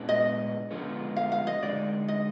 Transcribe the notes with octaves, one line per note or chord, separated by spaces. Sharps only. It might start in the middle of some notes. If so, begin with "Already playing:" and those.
Already playing: A#2 G#3 B3 D4
D#5
D3 F3 G#3 B3 F4
F5
F5
D#5
D3 G#3 D#4 D5
D#5